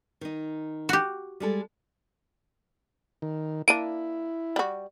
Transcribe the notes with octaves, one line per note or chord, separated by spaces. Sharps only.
D#3 D#4
F#4 G4
G3 G#3 A4
D#3
A#3 D4 E4 D7 D#7
G3 F#4